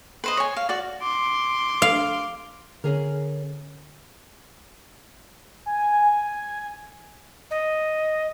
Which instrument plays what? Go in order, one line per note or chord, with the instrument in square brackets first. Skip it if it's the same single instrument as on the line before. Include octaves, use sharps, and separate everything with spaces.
[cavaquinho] B4 C5 D#5
C#5 G#5
F5
F#4 D5
[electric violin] C6 D6
[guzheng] F5
[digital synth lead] D3 [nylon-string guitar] C#4 G#4 A#4
[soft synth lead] G#5
[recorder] D#5